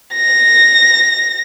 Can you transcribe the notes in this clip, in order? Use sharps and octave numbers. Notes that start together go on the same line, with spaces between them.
A#6